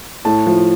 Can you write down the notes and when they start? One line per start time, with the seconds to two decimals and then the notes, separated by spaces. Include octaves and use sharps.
0.25 A2 A5
0.47 F3